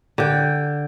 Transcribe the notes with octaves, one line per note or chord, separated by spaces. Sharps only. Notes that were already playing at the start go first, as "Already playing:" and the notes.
D3 G5